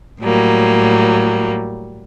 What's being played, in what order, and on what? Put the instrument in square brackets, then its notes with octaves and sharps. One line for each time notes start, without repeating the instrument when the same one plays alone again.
[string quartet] A2 F#3 G3 A#3